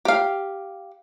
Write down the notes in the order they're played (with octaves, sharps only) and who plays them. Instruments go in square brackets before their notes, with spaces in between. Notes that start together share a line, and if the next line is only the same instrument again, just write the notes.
[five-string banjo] G4 F5